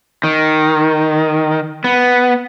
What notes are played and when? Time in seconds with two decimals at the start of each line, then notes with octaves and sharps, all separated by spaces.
0.24 D#3
1.84 B3